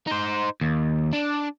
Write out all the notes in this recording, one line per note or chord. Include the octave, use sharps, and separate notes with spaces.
D#4 C5
D#2
D4